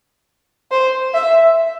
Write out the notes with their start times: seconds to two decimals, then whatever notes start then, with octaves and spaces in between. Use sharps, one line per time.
0.71 C5
1.14 E5